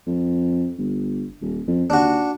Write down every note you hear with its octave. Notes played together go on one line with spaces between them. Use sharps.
F2
G1
D#1
F2
D#2 D4 F#4